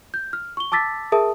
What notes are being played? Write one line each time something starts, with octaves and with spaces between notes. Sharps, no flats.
G6
F6
C#6 G7
A5 D6 E6 A6 B6
G#4 A#4 E5 A5 D#6